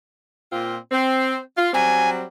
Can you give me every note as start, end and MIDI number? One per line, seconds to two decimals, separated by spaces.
0.52 0.76 46
0.52 0.76 60
0.52 0.76 65
0.92 1.37 60
1.57 1.70 65
1.74 2.25 54
1.74 2.25 55
1.74 2.25 60
1.74 2.09 80